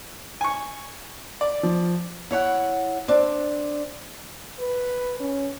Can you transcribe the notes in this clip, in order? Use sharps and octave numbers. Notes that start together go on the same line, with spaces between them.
G#5 C#6
D5
F3
E4 C#5 F#5
C4 D4
B4
C#4